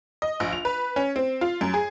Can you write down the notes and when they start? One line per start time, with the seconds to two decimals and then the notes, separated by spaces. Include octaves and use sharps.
0.22 D#5
0.40 A#1
0.52 F7
0.65 B4
0.96 C#4
1.16 C4
1.41 F4
1.61 F#2
1.74 G#4